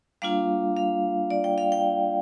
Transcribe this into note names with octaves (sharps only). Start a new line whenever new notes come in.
G3 A#3 D4 F4 F5
F5
D5
G5
F5
G5